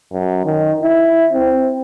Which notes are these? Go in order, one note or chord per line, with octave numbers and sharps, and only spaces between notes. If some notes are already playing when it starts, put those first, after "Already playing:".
F#2
D#3
E4
C4